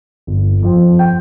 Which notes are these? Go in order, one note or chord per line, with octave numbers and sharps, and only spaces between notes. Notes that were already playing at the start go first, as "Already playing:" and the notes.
G1
F2 F3 C4
G5